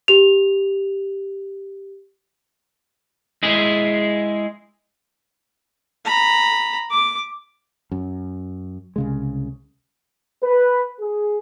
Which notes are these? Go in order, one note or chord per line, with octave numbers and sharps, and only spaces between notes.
G4 F7
G#3 E4 G#4
A#5 B5
D6
F#2
C2 C#3 G#3
B4
G#4